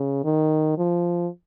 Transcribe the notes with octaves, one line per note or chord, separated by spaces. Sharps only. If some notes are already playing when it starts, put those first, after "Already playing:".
Already playing: C#3
D#3
F3